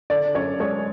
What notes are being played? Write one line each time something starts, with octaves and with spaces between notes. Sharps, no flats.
D3 D5
F#2 C#5
G#3 C#5